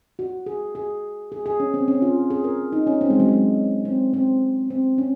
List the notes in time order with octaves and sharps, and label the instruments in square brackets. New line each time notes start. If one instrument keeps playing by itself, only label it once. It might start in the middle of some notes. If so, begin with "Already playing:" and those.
[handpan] F#4
G#4
G#4
G#4
G#4
C#4
C4
C#4
F4
G#4
A#4
D#4
C#4
C4
G#3
F#3
G#3
C4
C4
C4
C#4